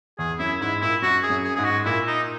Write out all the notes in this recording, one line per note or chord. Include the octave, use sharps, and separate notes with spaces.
E2 G#4
F#2 E4
G#2 E4
A#2 E4
F#2 F#4
G#4
F#2
G#4
G#2 G#4
F#4
A#2 E4
D#4